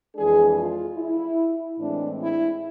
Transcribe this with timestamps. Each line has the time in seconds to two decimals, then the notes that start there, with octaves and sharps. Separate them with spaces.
0.16 F2 E3 G#3 D4 G#4
0.57 F4
0.97 E4
1.78 A2 E3 G#3 C4 D4
2.19 E4